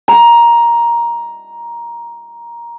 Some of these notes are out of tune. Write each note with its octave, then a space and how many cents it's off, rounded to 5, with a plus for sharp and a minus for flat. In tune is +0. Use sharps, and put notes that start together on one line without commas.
A#5 +10